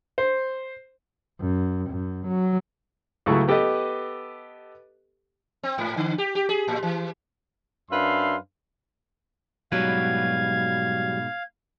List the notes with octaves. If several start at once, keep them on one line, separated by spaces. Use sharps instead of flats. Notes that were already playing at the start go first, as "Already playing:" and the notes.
C5
F#2
F#2
F#3
C#2 F#3 A3 E4 G#4 C#6
B3 G4 A4 B4 D#5
C4
G#2
D3
G4
G4
G#4
A2
E3
F#2 D4 B4 E5 F5 C6
G#2 B2 F#3 G3 B4 F5 G#6